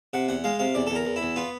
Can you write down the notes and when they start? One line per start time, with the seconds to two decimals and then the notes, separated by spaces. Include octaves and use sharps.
0.13 C3 F#5
0.28 E2 F#5
0.44 G#3 F5
0.59 C3 F5
0.75 E2 D5
0.87 E2 A4
0.95 A#4
1.05 E2
1.16 E4
1.22 E2
1.36 B3 F4